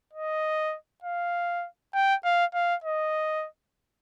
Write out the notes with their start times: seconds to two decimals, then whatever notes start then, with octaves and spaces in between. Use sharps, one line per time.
0.13 D#5
1.04 F5
1.94 G5
2.24 F5
2.54 F5
2.84 D#5